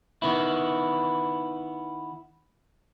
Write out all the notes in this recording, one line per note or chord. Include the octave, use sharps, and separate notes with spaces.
D#3 B3 E4